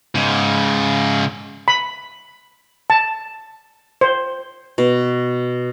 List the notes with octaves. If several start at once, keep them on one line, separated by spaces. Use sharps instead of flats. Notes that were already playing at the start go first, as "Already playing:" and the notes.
G#2 C#3
B5
A5
C5
B2